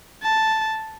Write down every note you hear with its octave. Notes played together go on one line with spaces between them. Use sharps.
A5